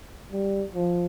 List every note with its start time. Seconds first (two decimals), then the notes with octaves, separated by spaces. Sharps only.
0.31 G3
0.75 F3